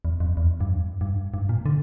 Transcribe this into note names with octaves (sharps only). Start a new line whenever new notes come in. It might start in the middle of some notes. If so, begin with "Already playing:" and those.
E2
F2
E2
G2
F2
G2
G2
A#2
D3